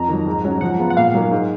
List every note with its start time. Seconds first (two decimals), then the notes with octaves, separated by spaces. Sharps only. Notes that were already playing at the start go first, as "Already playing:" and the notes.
Already playing: F2 A#5
0.09 D#3 F#3
0.27 G#2
0.45 F#3 C#4 F#4
0.61 F3 F#5
0.78 G#3 B3 F4
0.90 F#5
0.97 A#2 F5
1.14 F#3 A#3 D#4
1.31 G#2